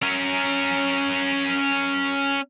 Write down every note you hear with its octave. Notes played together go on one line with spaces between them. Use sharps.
C#4 A#4